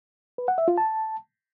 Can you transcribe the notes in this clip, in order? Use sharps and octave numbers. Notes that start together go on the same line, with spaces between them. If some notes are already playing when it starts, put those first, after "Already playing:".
B4
F#5
E5
F4
A5